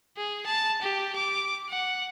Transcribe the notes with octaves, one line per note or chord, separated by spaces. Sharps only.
G#4
A5
G4
D6
F#5